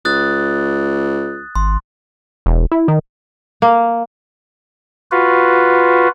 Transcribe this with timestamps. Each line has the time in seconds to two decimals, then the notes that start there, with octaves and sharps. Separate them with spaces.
0.05 C#2 D#6 F#6 A6
1.56 G#1 C6
2.46 E1
2.72 E4
2.88 D#3
3.62 A#3
5.11 F4 F#4 B4